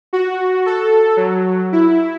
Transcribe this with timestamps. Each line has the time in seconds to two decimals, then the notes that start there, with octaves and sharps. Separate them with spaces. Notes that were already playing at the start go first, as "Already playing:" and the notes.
0.13 F#4
0.66 A4
1.17 F#3
1.72 E4